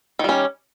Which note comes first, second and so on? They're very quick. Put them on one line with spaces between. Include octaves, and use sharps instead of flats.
D#3 G3 C#4